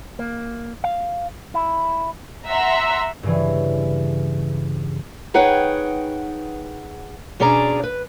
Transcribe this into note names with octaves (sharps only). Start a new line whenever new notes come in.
A#3
F5
E4
E5 F#5 A#5 C6 E6
G2 C#3 E3
D#4 G#4 B4 C#5 F#5 G5
B2 C#4 D4 G#4 D5 A#5
B4